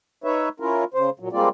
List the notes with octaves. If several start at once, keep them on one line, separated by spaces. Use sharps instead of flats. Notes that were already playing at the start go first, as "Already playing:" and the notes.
D#4 B4 C#5 E5
C#4 E4 F4 A#4
C#3 C5
A#2 F#3
G3 G#3 A#3 C4 F4 D5